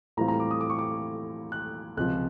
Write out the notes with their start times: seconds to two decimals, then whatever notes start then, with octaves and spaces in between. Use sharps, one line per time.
0.17 A2 E3 G3 C4 F4 A#5
0.28 A#5
0.40 D6
0.51 D#6
0.61 D6
0.70 C#6
0.79 D6
1.52 F#6
1.97 C#2 C3 F3 F#6